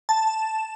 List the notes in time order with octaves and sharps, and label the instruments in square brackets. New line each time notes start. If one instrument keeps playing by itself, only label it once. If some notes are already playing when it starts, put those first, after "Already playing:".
[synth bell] A5